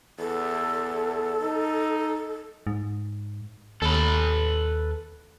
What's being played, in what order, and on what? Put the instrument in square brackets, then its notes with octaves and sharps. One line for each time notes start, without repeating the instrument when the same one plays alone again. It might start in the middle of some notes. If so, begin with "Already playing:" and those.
[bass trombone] E2 [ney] A4
[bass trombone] D#4
[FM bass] G#2
[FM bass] D#2 [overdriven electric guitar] A4 B4